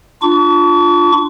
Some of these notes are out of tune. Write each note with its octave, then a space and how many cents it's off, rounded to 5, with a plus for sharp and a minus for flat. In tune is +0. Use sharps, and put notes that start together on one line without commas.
D4 +15 F4 +0 C#6 +45